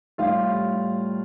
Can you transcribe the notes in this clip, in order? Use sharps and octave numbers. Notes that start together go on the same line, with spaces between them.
A2 G3 F4 F5